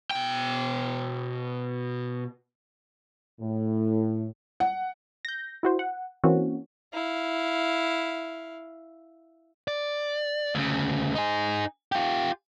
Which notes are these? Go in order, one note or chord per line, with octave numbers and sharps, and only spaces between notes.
B2 G5
A2
F#5
G6 A#6
E4 F#4 C5
F#5
E3 A#3 C4 C#4 F#4
E4 F5
D5
D2 C#3
D#4 G#4
F4 G4